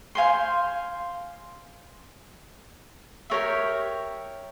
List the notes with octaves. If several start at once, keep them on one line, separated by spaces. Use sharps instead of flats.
C5 F5 G#5 C6
G4 A#4 C#5 E5